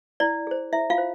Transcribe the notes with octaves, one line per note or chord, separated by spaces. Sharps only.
E4 D5
G#4 C5
E4 E5
F4 F5
C5